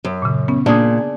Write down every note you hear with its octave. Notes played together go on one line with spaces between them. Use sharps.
F#2
A#2 C#3
B3 C#4
A#2 D4 G#4